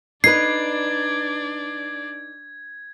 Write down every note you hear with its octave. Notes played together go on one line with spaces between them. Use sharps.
D4 D#4 B4 D5 G#6 C7